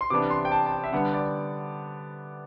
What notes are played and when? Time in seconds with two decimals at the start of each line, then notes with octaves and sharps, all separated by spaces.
0.01 C6
0.10 C3 E3 B3 D4 D6
0.30 C6
0.45 G5
0.52 A5
0.66 A5
0.72 G5
0.84 E5
0.92 D3 G3 B3 D4 F#5
1.13 D5